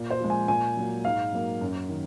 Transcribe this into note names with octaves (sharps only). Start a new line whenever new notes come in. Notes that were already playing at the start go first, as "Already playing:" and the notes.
Already playing: A#2
C5
F3 G#3
G#5
A#2 G#5
F#3 A#3
G#2 F5
F#3 A#3
F#2
D#3